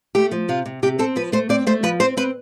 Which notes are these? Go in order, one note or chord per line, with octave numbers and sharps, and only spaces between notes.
A3 G4
F3
C3 F4
C3
C3 G4
C4 A4
F3 B4
A3 C5
C4 D5
A3 C5
F3 B4
C4 C5
C4 B4